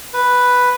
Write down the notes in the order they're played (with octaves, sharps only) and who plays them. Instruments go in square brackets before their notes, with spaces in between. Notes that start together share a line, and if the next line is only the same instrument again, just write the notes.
[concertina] B4